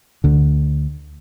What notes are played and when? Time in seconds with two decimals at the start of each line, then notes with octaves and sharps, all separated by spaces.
0.24 D2 D3